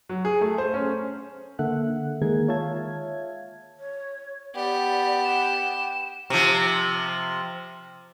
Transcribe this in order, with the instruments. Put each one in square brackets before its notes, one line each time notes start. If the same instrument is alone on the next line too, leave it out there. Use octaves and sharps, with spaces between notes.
[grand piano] F#3
G#4
A3
C5
C#4
[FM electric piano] D3 A#3 A4 E5 F#5 F#6
D#3 G#3 A#3 G#4 A#4 G#6
F4 C#5 E5 F5 A5 G#6
[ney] C#5
[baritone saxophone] B3 [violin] G4 [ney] D5
[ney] F#5 [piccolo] E7
[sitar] C3 F3